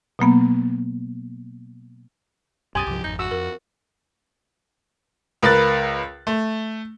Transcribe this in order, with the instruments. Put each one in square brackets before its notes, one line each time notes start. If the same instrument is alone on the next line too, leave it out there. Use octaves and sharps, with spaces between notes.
[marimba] B2 F#3 A#3 B3
[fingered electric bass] B1 F#2 [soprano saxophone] G4 [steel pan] G#5 [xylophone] C6 D#6 A6
[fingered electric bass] C2 G2 F3 [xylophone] D6
[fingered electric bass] G#1 F2 [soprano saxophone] D#4 [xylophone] G6
[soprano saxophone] F#4 [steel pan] E6
[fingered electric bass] F2 [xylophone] A#4
[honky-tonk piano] C#2 A#4 B4 B5 F#6 A6
A3